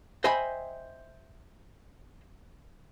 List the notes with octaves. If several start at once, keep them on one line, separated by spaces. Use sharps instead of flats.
C5 D#5 E5 G5 G#5 B5